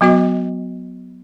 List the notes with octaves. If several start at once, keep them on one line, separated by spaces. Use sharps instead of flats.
F#3 B3 F#4 D#5